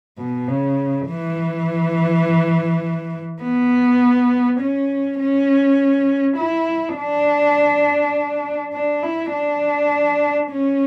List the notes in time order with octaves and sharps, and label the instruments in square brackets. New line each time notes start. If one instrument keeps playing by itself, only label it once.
[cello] B2
C#3
E3
B3
C#4
C#4
E4
D4
D4
E4
D4
C#4